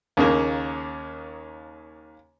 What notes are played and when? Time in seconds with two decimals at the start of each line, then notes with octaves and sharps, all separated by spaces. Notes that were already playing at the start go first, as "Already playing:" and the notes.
0.17 D#2 C#3 A#3